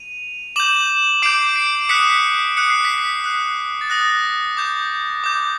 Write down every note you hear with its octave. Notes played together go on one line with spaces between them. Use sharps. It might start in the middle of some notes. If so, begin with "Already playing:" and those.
Already playing: D#7 F7
D6 G6 E7 F#7
D6 G6 C7 D7
C7 D7
D#6 F#6 B6 C#7
D#6 F#6 C#7
C7
B6
C7
D#6 F#6
A6
D#6 F#6 A#6
D6 G6
D6 G6